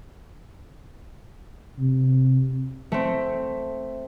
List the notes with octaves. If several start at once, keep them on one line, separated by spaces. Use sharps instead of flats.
C3
A3 C4